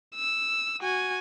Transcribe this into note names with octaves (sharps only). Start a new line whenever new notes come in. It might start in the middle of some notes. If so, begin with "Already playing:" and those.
E6
F#4 G#5